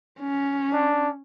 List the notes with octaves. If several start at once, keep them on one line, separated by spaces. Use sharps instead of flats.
C#4
D4